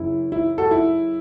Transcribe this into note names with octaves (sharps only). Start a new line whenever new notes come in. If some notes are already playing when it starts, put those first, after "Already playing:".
Already playing: F#2 C#3 E3 E4
E4
F#4 A4
E4